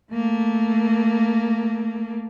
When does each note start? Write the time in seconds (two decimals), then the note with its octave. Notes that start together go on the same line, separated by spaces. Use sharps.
0.13 A3 A#3